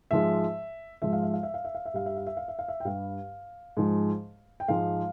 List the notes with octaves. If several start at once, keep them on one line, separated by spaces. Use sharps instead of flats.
G#2 F3 G#3 E5
G#2 F3 G#3 E5
F5
E5
F5
E5
F5
E5
F5
E5
G2 G3 F5
E5
F5
E5
F5
E5
F5
E5
G5
G2 G3 F5
G#2 F3 G#3
G5
G#2 F3 G#3 F5